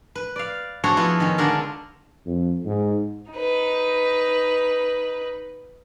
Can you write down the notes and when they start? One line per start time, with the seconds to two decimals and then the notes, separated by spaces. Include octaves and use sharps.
0.15 B4
0.36 D5 F5
0.84 D4 F#4 G#4 A4 C5 C#5
0.97 F3 B3 E4 F4
1.20 D#3 C#4
1.38 D3 G#3 D4 A4 A#4
2.26 F2
2.66 G#2
3.32 D#4 B4